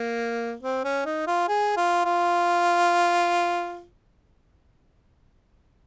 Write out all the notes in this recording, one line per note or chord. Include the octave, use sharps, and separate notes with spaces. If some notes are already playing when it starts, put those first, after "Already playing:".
Already playing: A#3
C4
C#4
D#4
F4
G#4
F4
F4